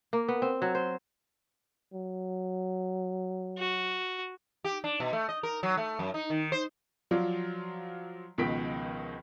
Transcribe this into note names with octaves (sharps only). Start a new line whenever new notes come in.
A#3
B3
C4
F#3
C5
F#3
F#4
G4
D4
B2
A3
D#5
A#4
F#3
A3
F#2
D#4
D#3
C5
F3 F#3 F4 D5
C#2 B2 D#3 F3 B6 D7